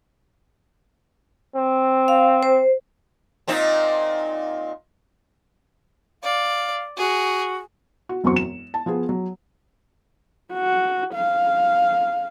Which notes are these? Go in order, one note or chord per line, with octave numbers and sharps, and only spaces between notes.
C4
F5
C5
A#2 C4 D#4
D5 F5
F#4 G#4
F#4
E1 F#2 F#3 C4 F#4 C#6
E7
A5
F3 B3 G#4
F#3
F#4
F5